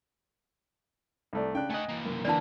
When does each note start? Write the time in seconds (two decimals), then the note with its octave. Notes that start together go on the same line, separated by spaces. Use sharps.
1.33 C2 A3 D5
1.55 C#3 D4 G5 F#6
1.70 A3 D#5 F#5 G#5
1.89 E3 A#3
2.05 F#2
2.25 D3 E3 A#3 B3 D5 A5